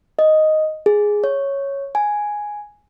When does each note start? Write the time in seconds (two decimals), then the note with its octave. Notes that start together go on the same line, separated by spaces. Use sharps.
0.19 D#5
0.86 G#4
1.24 C#5
1.95 G#5